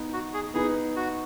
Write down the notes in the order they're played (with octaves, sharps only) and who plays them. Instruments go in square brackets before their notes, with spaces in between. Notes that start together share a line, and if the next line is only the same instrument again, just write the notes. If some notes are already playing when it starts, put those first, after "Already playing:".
Already playing: [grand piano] B3 D#4 B4
[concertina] F#4
G#4
[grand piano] B3 D#4 B4 [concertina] G#4
[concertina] F#4